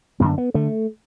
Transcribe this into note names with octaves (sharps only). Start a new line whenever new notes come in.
F#2 D3 B3
B3
D3 A3